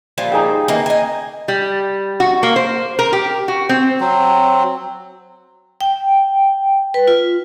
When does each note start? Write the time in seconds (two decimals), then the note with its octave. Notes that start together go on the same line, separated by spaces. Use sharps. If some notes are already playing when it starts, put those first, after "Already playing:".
0.18 A#2 F3 G3
0.32 D#4 G#4 G5
0.68 D#3 E3 A#3
0.86 D#5 G#5
1.48 G3
2.20 F#4
2.43 A#3
2.56 C5
2.99 A#4
3.13 G4
3.48 F#4
3.69 C4
4.00 F#3 C4
5.81 G5
6.94 B4
7.08 F4